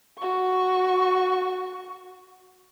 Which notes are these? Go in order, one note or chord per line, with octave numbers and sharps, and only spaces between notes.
F#4 C#6